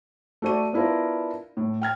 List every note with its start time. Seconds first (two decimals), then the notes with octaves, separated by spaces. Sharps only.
0.42 A3 F#4 D5 D#7
0.73 B3 D4 E4 F4 A#4
1.57 A2
1.82 G5 F6 G#6